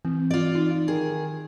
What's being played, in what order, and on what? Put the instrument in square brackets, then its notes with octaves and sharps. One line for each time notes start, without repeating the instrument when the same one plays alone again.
[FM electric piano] E3 [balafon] C4
[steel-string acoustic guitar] F4 D5
[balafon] D#4
[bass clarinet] D#3 [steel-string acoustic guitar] G#4